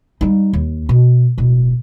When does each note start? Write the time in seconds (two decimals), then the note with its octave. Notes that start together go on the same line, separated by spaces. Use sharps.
0.21 G3 D#4
0.53 D#2
0.89 B2
1.38 D1 B2